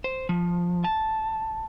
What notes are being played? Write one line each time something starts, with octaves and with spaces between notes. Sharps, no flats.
C5
F3
A5